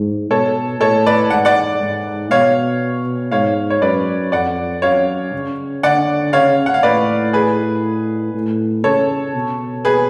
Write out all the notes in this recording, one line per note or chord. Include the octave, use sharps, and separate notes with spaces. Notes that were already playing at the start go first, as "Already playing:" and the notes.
Already playing: G#2
B2 A4 C#5
A2 A4 C#5
B4 D5
G#2 F#5
D5 F#5
G#2
B2 C#5 F5
G#2 C#5 F5
C#5
F#2 B4 D5
F2 D5 F#5
F#2 C#5 F5
C#3
D3 D5 F#5
C#3 C#5 F5
F#5
F5
A2 B4 D5
G#4 B4
A2
C#3 A4 C#5
B2
G#4 B4